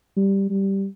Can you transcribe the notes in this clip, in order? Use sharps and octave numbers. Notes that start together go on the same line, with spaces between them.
G3
G3